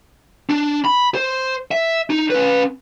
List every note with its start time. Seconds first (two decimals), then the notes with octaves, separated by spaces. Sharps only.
0.50 D4
0.85 B5
1.15 C5
1.71 E5
2.10 D#4
2.30 C#4 B4